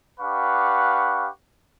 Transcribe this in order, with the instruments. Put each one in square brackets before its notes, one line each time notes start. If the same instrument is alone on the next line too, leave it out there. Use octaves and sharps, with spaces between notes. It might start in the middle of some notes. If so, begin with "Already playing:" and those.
[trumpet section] D4 G4 B4 F5 F#5 C#6